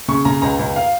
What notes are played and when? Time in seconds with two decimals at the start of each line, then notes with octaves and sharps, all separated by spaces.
0.08 C#3 C#6
0.25 C#3 A#5
0.42 C#2 A#5
0.59 C#2
0.76 F5